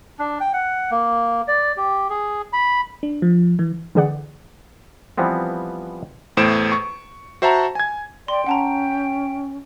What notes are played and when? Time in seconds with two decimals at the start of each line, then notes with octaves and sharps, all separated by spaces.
0.19 D4
0.40 G5
0.53 F#5
0.91 A#3
1.48 D5
1.77 G4
2.10 G#4
2.53 B5
3.03 D4
3.22 F3
3.59 E3
3.95 D3 E3 G#4 D5 F#5
5.18 E3 F3 G3 B3 C4
6.37 E2 A2 C5 D7 E7
6.72 C#6
7.42 F#4 C5 E5 F#5 A5 A#5
7.75 G#5 G#6
8.28 D5 G5 C6
8.46 C#4 F#5 A5 A#5